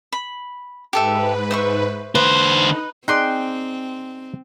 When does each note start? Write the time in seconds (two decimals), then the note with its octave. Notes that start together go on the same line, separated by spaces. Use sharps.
0.12 B5
0.93 G#2 G4 A4 B4 E5
1.51 C5 E5 C#6
2.15 D3 B4 C5 F#6
2.49 D#4
3.08 C4 D#4 G#4 D5 G5 C6 F#6